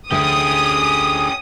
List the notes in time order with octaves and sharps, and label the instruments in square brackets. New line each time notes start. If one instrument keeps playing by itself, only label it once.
[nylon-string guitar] D2 D3 A3 [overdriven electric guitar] C#4 G4 [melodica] G#4 [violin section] D#6